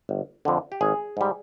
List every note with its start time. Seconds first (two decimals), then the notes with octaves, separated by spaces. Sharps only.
0.09 G1
0.45 F2 D3
0.72 G4
0.81 G#1 G#4
1.17 G#2 G3